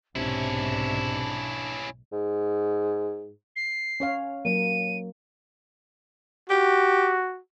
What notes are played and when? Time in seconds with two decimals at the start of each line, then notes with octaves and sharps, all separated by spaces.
0.16 B1 G#2 C3 C#4 D4 E4
2.12 G#2
3.56 C7
4.00 C#4 C#5 F5
4.45 F#3 A#3 D#7
6.50 F#4 G4